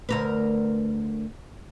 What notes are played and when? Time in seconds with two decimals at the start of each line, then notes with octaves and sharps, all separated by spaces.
0.09 D2 A#4 B4